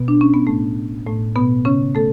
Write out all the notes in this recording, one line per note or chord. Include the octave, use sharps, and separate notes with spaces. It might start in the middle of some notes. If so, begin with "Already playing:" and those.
Already playing: B2 B3
D4
C#4
B3
A2 A3
A2 A3
B2 B3
C#3 C#4
A3 A4